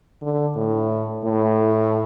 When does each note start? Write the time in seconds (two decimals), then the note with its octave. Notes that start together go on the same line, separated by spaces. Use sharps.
0.22 D3
0.57 A2
1.25 A2